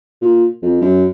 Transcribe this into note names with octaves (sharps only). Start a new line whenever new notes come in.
A#2
F2
F#2